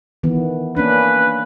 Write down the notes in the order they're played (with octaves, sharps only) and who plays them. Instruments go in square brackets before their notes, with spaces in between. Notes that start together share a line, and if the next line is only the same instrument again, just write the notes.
[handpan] D#3 E3 B3
[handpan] A#3 C#4 D4 [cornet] B4